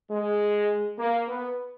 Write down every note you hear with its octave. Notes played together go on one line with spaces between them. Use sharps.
G#3
A#3
B3